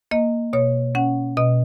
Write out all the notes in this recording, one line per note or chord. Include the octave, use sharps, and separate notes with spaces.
A#3 D#5
B2 C#5
C#4 F#5
B2 D#5